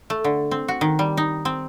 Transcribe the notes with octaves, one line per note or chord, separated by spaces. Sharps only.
A3
D3
C4
F#4
D#3
G3
D#4
C4